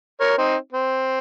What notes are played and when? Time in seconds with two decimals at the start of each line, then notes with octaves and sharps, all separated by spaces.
0.20 A#4 C#5
0.38 C4 D#4
0.72 C4